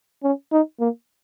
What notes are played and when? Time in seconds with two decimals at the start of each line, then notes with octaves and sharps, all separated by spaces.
0.23 C#4
0.52 D#4
0.80 A#3